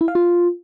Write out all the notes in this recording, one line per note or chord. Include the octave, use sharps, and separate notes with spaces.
E4
F5
F4